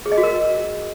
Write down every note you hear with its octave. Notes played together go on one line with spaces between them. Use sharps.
G#4
D#5
F#4
A#4